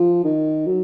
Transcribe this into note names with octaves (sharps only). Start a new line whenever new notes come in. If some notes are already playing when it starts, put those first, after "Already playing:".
Already playing: F3
D#3
F#3